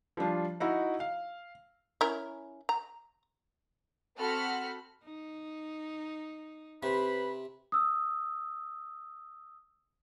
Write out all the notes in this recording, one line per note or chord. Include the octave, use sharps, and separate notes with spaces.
F3 G3 D4 F4
D#4 E4 F#4
F5
C#4 E4 A#4
A#5
C4 F#4 A4 F#5 B5 F6
D#4
C3 B4 C5 B5
D#6 E6